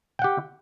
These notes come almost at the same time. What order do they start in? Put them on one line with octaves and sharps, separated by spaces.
G5 F#5 G4